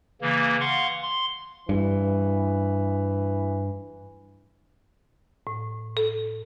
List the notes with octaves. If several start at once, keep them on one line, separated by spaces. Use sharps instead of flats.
C#3 E3 A#3
F5 F#5 C6 C#6
C6
G2 E3
A2
A4